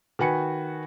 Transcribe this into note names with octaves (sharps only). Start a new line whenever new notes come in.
D#3 F#4 B4 G#5 C#7